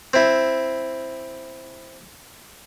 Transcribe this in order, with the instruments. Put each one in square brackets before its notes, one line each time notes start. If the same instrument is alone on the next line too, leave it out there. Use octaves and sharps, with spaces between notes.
[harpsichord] C4 E4